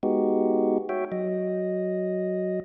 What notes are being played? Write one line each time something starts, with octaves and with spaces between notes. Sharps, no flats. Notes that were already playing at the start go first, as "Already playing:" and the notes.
G#3 B3 D#4 F#4 G4
F#4 C#5 E5 G5
F#3 D#5